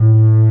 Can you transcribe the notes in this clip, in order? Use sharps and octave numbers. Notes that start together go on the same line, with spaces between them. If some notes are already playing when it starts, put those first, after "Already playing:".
Already playing: A2